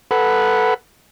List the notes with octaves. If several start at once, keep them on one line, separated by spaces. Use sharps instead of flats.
A4 B4 F#5 B5